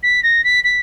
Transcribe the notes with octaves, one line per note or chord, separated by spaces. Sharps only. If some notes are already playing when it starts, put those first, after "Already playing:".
B6
A#6
B6
B6